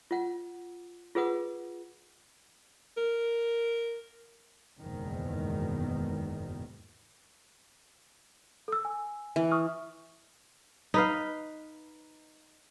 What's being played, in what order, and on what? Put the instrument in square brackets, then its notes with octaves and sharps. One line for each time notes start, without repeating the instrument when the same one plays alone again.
[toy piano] F4 F#5
F4 G#4 B4 F#5 D#6
[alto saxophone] A#4
[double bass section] F#1 E2 G#2 B2 D#3
[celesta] A4 E6
G#5
[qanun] E3
[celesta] C#6 D#6 F6
[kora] D#4 B4 F5